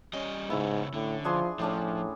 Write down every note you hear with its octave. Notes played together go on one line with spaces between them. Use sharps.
G3 C#4 D#5
G#2 C#3 B3 E4
A2 D3
F3 D4 G#4 C6
A2 F3 C#4 D4 G#5